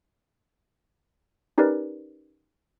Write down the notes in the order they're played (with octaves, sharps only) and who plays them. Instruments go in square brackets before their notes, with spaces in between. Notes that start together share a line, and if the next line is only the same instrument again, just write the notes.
[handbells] C#4 D#4 G4 A#4 B4 D5